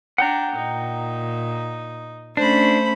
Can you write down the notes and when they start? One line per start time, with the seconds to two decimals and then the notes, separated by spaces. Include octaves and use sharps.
0.18 D4 F#5 G5 A#5
0.56 A#2 D#4
2.37 A3 C#4 D4 C5 B5